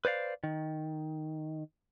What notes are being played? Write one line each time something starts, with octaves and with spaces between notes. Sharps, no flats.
B4 C5 D5 F5
D#3